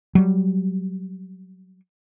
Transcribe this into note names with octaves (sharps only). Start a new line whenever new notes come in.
F#3 G3